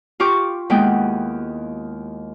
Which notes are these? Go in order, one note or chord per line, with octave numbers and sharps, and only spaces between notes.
F4 G4 C#6 D6
D#2 G#3 B3 E4 G5